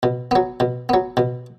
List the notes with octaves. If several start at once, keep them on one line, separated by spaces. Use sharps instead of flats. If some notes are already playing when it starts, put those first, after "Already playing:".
B2
F#3 B3
B2
F#3 B3
B2